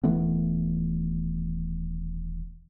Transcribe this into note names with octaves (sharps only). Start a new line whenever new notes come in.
D#1 E3 A3 B3